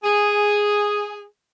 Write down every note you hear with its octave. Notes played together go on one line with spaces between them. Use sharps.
G#4